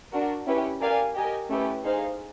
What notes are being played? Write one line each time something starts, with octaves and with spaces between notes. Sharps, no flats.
D4 F#4 A#4
C#4 E4 G4 B4
G4 A#4 D5 F5 G#5
G4 A#4 D#5 G#5
A3 C#4 E4 G4 B4
D#4 G#4 C5 F5